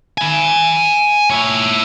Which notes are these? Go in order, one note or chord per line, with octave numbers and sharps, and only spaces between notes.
G#5 B5
E4 C#5